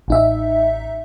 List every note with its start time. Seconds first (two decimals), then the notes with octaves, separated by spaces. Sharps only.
0.08 A1 D#4 E5